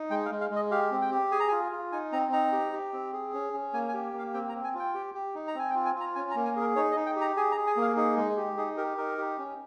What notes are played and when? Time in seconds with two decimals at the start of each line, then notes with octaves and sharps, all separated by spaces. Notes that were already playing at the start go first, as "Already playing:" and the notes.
Already playing: D#4
0.10 G#3 G5
0.26 F5
0.31 G#3
0.41 F5
0.51 G#3 D#5
0.71 G4 F5
0.91 C4
1.01 G5
1.11 G4
1.32 G#4 G#5
1.40 A#5
1.48 G#5
1.52 F4
1.72 F4
1.92 D#4 G#5
2.12 C4 A#5
2.32 D#4 A#5
2.52 G4
2.72 G4
2.93 C4
3.13 G#4
3.33 C#4
3.53 C#4
3.73 A#3 G#5
3.89 G#5
3.93 G4
4.14 A#3 F5
4.34 C4 G5
4.49 A#5
4.54 C4
4.64 G#5
4.74 F4
4.79 G5
4.94 G4
5.14 G4
5.35 D#4
5.47 A#5
5.55 C4 G#5
5.70 G5
5.75 F4
5.85 G#5
5.95 F4
6.00 A#5
6.15 C#4 G#5
6.30 A#5
6.35 A#3
6.45 G#5
6.56 G#4 A#4
6.76 D#4 C#5
6.91 D#5
6.96 D#4
7.06 G5
7.16 G4
7.21 A#5
7.37 G#4 G#5
7.52 A#5
7.56 G#4
7.67 G#5
7.77 A#3
7.82 F5
7.96 D#4 G#4
8.17 G#3
8.37 G4
8.57 D#4 G#4
8.77 G4 A#4
8.97 D#4 A#4
9.18 G4
9.38 C#4